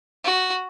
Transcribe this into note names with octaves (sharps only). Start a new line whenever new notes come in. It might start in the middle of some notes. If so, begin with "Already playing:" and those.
F#4